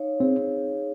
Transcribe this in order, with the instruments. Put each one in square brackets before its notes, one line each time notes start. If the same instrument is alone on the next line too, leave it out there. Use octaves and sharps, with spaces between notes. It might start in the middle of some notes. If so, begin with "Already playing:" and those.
Already playing: [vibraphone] D#4 C#5 F5
[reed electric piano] C4 [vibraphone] G#4